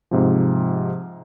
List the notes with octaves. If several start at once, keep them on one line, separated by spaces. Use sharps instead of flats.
G#2 C3 F3